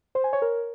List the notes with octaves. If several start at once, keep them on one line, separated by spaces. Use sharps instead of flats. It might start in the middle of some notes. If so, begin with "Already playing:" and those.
C5
G#5
C#5
A#4